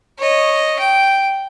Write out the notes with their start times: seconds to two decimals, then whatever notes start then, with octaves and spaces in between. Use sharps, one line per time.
0.19 C#5 D#5
0.79 G5